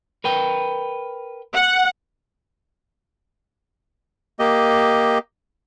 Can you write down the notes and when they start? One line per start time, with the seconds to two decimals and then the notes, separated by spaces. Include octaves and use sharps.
0.24 A#4 B4 G5
1.55 F#5
4.39 A#3 G4 D#5